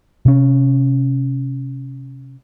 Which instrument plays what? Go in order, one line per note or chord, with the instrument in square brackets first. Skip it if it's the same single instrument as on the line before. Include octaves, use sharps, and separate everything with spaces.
[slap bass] C3 C#4